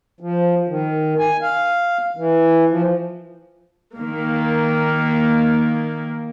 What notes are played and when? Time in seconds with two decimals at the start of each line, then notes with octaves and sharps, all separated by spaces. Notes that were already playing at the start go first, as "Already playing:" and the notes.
0.20 F3
0.68 D#3
1.18 G#5
1.42 F5
2.17 E3
2.69 F3
3.96 D#3 A#3